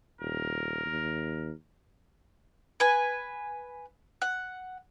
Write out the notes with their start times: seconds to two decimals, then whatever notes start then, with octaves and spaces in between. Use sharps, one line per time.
0.21 D#1 A#4
0.85 D#2
2.80 B4 G#5
4.22 F#5